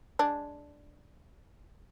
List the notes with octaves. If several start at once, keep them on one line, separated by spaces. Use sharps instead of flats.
G#3 D4